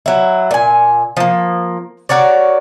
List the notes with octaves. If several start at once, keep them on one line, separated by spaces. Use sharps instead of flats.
F#3 E4
A#2 G#5
F3 A#3
F#4 A#4 C#5 D5